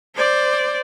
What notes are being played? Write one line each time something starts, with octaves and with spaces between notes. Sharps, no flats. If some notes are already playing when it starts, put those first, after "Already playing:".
C5 D5